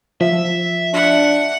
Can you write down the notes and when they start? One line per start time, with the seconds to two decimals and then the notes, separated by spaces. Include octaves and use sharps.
0.21 F3 E5
0.94 D4 F#5